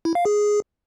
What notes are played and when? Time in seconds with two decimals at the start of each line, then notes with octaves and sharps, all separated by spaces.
0.05 E4
0.15 F5
0.25 G#4